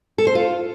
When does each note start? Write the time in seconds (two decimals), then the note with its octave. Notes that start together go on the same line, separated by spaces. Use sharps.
0.18 A4
0.27 C5
0.35 F4